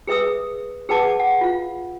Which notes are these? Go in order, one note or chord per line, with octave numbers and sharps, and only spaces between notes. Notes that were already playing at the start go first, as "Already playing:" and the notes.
G#4 B4 E5 D#6 E6
G#4 B4 F#5 A5 D6
F#5
F4 F5